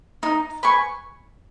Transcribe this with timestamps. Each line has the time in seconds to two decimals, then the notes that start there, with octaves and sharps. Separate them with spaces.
0.23 D#4
0.63 B4 G#5 C#6